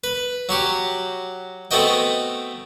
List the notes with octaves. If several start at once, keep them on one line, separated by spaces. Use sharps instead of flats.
B4
F#3 F#4 G4
A3 B3 C4 F#4 D#5 G5